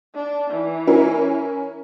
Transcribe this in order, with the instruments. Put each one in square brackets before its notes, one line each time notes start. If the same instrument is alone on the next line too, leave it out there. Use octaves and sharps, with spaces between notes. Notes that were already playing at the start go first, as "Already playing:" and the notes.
[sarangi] D4
E3
[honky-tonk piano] C#4 E4 A#4